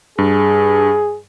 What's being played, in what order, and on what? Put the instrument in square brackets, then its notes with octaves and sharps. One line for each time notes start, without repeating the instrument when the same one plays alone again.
[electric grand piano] G2 [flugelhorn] G#4